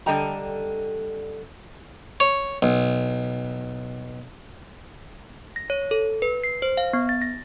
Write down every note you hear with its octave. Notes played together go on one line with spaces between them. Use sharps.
D3 G3 A4 D#5 G5 A#5
C#5
B1
A#6
C#5
A4
B4
C7
C5
F5
B3
A6
A#6